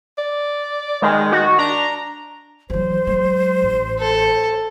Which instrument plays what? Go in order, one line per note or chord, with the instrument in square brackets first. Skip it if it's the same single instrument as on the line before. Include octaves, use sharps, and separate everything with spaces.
[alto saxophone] D5
[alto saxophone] D#3 [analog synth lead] G#3
[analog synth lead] F#4
[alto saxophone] D4 [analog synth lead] A#5
[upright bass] E3 F#3 [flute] C5
[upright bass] F#3 G#3
A1
[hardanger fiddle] A4